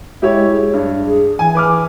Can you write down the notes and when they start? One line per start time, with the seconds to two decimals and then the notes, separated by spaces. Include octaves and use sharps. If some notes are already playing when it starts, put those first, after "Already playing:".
0.22 G#3 E4 G4 C#5
0.51 G#4
0.74 G2
1.07 G#4
1.39 E3 G#5
1.55 B4 D6 F6